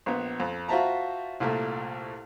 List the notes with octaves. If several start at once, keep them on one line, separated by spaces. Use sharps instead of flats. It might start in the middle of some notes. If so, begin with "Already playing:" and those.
A#1 B3
F2
F4 F#4 C5 E5 A5 A#5
C2 A#2 A3